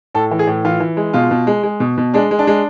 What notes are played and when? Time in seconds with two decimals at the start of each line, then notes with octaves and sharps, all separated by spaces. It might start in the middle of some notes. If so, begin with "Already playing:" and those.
0.15 A2 A4
0.31 E3
0.39 G#4
0.47 A2
0.65 E3 F4
0.80 E3
0.97 G#3
1.13 B2 F4
1.31 B2
1.47 G#3
1.63 G#3
1.80 B2
1.98 B2
2.14 G#3 D4
2.31 G#3
2.39 D4
2.47 G#3